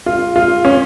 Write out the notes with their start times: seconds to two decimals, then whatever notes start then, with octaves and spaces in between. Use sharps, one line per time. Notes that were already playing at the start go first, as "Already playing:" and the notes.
0.06 F4
0.36 F4
0.65 C#4